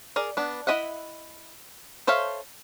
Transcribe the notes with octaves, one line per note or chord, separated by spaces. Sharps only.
G#4 A#4 D5
B3 D4
E4 F4 D#5 E5 F#5
A4 C5 C#5 E5 F5